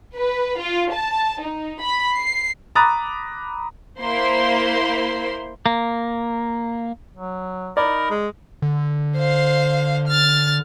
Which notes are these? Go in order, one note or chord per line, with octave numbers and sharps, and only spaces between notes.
B4
F4
A5
D#4
B5
C7
A#5 B5 D6 D#6 F#6 A6
A#3 E4 C5 C6
A#3
F#3
D#4 A#4 D5 B5
G#3
D3
C5 F5
F6 A6